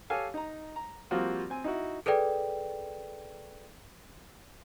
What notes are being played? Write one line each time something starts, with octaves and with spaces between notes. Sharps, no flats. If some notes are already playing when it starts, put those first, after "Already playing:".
G4 A4 C#5 F5 G#5
D#4 A#5
A#5
F3 G3 A#3 C4 F4 F#4
C4 G#5
D#4 E4 F#4
G#4 A4 B4 D5 G5